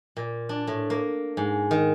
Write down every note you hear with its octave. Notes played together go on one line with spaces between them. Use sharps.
A#2
D4
A2
A#3
G#2
D#3